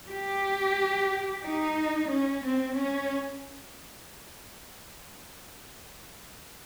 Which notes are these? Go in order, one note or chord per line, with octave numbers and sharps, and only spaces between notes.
G4
D#4
C#4
C4
C#4